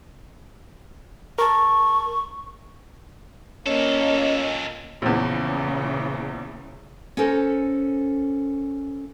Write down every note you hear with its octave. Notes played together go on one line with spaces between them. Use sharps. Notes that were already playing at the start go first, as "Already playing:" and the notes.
A#4 A5 C#6
A#2 A#3 C#4 A4 D#5
A#1 E2 A#2 C#3 E3
C#4 A4 A#4 C5